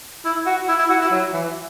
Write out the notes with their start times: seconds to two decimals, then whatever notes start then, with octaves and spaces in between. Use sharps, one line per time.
0.25 E4
0.46 F#4
0.69 E4
0.79 E4
0.90 F#4
1.01 E4
1.12 F#3
1.33 E3